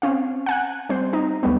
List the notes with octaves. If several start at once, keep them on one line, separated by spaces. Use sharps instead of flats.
C4 C#4 F5
F#5 G#5 F#6
G3 C4 C5
C4 D#4
D2 F#3 G3 B3